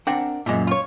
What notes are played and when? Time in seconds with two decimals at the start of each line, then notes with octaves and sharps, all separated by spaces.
0.07 C4 D4 A#4 F#5
0.46 F#2 A#2 G#3 E5
0.67 F4 C#5